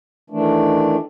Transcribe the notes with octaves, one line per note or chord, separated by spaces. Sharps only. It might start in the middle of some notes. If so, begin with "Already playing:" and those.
D#3 E3 A3 D4